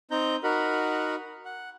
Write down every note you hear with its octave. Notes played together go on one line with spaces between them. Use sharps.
C4 D#4 A#5 G6
D#4 F#4 A#4 F#5 B5
F#5